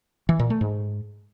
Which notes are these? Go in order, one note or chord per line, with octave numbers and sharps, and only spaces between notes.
E3
A#2
A3
G#2